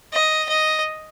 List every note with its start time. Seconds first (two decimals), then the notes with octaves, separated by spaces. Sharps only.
0.13 D#5
0.49 D#5